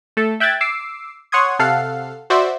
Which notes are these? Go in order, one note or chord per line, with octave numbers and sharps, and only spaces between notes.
A3 A4
E5 G5 F#6 G#6 A6
D6 E6 C7
C#5 F#5 C6 D#6 G#6
C3 A4 F5 F#5 C7
F#4 C5 D5 E5